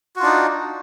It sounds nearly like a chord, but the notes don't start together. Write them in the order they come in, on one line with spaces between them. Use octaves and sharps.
F#4 F4 D4 D#4